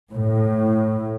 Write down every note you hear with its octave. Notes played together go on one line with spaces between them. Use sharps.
A2